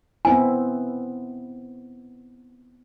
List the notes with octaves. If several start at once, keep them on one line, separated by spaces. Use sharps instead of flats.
B3 C4 E4 G#5